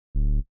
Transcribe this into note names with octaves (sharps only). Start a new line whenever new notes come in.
D1